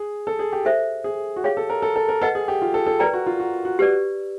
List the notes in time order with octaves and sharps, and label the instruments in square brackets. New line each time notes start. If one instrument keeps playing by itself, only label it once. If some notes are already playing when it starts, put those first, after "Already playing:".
Already playing: [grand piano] G#4
A4
G#4
G4
[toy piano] A4 C5 E5
[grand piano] G#4
F#4
[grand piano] G4 [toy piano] G#4 C#5 F5
[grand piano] A4
A#4
A4
A4
A#4
[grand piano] A4 [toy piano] B4 D#5 F#5
[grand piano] G#4
G4
F4
A4
A4
[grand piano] A#4 [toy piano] B4 D5 G5 A#5
[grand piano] F#4
F4
F#4
F#4
[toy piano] G4 B4 D5